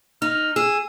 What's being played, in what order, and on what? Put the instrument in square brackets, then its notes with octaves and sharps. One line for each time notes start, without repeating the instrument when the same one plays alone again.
[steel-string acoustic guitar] D#4 [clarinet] F6
[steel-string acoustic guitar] G#4 [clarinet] E6